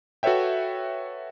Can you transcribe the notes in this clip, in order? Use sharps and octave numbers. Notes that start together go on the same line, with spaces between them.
F#4 A4 B4 C#5 E5 G5